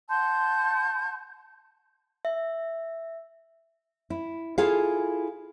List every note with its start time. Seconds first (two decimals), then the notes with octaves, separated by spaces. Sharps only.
0.09 F#5 A5 C6 G6
2.25 E5
4.10 E4
4.58 E4 F4 G#4 A4 F5